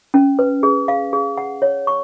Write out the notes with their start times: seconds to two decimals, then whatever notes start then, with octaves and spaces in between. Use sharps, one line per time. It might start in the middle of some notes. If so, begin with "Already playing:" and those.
0.14 C#4
0.39 B4
0.63 G#4
0.88 F5
1.13 G#4
1.38 F#5
1.62 C#5
1.87 C#6